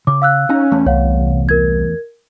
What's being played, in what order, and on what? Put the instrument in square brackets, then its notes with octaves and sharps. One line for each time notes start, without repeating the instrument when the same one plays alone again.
[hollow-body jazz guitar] C#3 [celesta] D6
[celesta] F5 E6 F#6
[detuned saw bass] C#4 [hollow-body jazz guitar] D#4 G#5 A#5
[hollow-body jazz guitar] E2 A3
[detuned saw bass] C2 [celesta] C#5 F5 F#5
[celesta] A#4 G#6